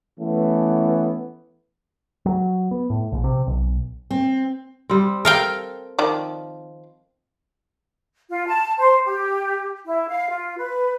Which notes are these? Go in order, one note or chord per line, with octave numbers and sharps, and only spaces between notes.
E3 A3 B3 C#4
F#3
B3
A2
A#1
C3
B1
C4
G3 C4
A4 A#4 F5 G5
D#3 F3 D5
F4
A5
C5
G4
E4
F5
F4
B4